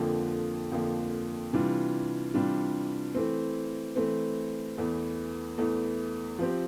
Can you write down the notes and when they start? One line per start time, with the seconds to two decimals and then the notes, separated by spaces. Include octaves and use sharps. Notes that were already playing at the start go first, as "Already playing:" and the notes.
Already playing: F2 D3 F3 A#3
0.72 F2 D3 F3 A#3
1.53 C3 E3 G3 D4 F4
2.34 C3 E3 G3 D4 F4
3.15 E3 A3 C4
3.96 E3 A3 C4
4.77 E2 E3 A3
5.58 E2 E3 A3
6.39 F3 C4 G4